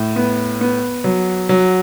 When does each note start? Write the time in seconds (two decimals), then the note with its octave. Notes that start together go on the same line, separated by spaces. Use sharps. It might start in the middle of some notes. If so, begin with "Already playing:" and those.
Already playing: A2
0.16 B3
0.61 B3
1.04 F#3
1.49 F#3